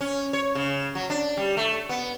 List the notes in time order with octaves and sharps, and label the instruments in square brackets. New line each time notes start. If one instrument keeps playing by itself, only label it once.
[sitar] C#4
C#5
C#3
F#3
D4
G3
A3
B3